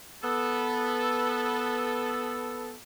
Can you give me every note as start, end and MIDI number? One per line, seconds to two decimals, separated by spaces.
0.24 2.73 59
0.24 2.73 69